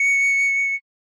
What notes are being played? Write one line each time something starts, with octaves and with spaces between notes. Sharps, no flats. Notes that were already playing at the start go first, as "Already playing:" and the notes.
Already playing: C#7